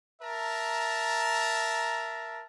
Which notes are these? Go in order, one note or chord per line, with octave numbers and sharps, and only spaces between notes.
A#4 E5 A5 A#5